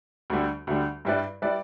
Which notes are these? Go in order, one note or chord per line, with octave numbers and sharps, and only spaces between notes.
D2 D3 G3
D2 D3 G3
G2 G3 E4 B4 D5
G3 E4 B4 D5